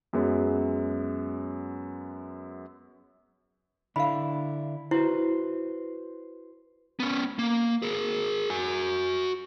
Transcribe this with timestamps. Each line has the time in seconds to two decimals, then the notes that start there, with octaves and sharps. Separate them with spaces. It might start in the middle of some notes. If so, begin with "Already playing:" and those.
0.13 F#2 F#3 G#3 B3
3.96 D3 D4 E4 F5 B5
4.91 E4 F#4 B4 C5
7.00 B3 C#4
7.39 A#3
7.82 G#4 A#4
8.50 F#4 G#5